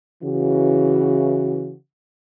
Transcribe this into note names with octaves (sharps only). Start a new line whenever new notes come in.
C#3 E3 F#4